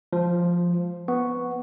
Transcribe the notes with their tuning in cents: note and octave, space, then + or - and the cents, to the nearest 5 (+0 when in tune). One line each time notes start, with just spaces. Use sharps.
F3 +0 G#3 +0
B3 +0 C#6 +0